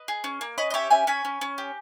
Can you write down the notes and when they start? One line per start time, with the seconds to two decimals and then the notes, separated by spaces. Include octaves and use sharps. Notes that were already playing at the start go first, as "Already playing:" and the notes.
Already playing: B4 D#5
0.08 G#4
0.24 C#4
0.41 A#3
0.58 C#4 B4 D#5
0.70 D#5
0.74 G4 C#5 E5
0.90 C#4 E5 G#5
1.07 C#4 G#5 B5
1.25 C#4
1.41 C#4
1.58 G4